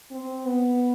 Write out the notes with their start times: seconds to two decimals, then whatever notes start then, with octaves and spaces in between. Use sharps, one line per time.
0.11 C4
0.46 B3